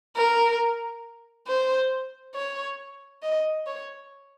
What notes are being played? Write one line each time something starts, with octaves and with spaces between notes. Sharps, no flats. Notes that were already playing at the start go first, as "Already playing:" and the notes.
A#4
C5
C#5
D#5
C#5